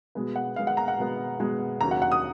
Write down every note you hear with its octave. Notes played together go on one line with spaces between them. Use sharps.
B2 G#3 B3
F#5
B2 G#3 B3 F5
F#5
A#5
F#5
B2 G#3 B3
B2 G#3 B3
D#2 C#3 F#3 A#5
F#5
F#5
D#6